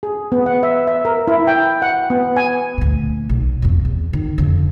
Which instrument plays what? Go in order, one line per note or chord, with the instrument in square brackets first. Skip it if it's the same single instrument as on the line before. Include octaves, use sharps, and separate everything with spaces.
[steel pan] G#4
B3
F#5
E5
E5
A#4
E4
G5
F#5
B3
G#5
[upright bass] D2 A#2
B1
F2 B2
E2
D#3
F2 D3